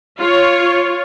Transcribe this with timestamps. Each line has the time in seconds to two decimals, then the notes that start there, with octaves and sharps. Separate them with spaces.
0.20 F4 C#5